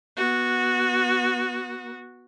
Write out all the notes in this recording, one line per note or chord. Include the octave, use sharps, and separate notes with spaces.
B3 F#4